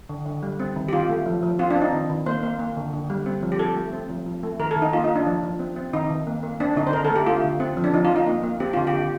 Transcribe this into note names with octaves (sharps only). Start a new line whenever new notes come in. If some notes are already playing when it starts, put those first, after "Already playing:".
D3
D3
G3
C4
D#3
G4
D#3 F4
A3
F3
F3
C4 F4
D4
C4
D#4
D#3
D#3
A#3 C5
A#3
A#3
D3
D3
G3
C4
F3
G4
F3 A4
A3
C4
F3
F3
A3
D#3 A#4
A4
D#3
D#4
A#3 F4
D#4
A#3
D4
F3
F3
C4
C4
D#3 D#4
D#3
A#3
A#3
C4 D4
D3 D#4
C5
D3 A#4
A4
A3
G4
A3 F4
D3
C4
F3
D4
F3 D#4
F4
F3
D#4
A#3
A#3
C4 G4
D3 F4
G4
D3